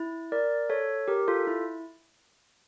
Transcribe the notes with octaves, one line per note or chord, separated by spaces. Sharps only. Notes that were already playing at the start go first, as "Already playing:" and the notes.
Already playing: E4
A#4 D5
A4 C#5
G4 A#4
F4 A4
E4